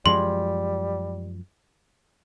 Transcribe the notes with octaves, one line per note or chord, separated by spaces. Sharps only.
F#2 F3 G3 G#3 C6